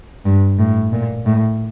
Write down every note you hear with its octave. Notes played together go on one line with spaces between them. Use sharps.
G2
A2
A#2
A2